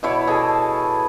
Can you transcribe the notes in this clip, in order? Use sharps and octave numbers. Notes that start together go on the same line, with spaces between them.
B2 E4 C#5 D5
B2 G#4 A4